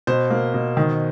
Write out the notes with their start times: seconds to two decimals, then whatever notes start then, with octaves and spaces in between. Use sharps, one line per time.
0.07 B2 C5
0.30 A#3
0.54 B2
0.77 D#3